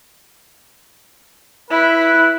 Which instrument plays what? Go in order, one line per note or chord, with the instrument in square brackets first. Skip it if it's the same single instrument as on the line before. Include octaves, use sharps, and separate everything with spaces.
[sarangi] E4 [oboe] B4